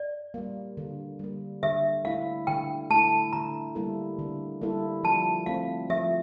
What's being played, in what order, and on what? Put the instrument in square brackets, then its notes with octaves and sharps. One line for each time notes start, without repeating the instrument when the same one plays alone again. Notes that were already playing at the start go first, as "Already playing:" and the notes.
Already playing: [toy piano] D5
[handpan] G3 A#3
D3
G3 A#3
[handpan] D3 [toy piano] E5
[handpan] A3 E4 [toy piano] F5
[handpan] D3 [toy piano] G5
[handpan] A3 E4 [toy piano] A5
[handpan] D3 [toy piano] A#5
[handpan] G3 A#3 E4 A4
D3
G3 A#3 E4 A4
[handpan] F3 [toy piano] A5
[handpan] A3 C4 [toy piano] F5
[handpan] F3 [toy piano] E5